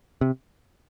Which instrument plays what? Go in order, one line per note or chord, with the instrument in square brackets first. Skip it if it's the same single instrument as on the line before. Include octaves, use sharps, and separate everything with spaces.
[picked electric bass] C3